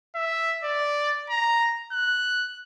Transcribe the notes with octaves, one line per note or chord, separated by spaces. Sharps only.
E5
D5
A#5
F#6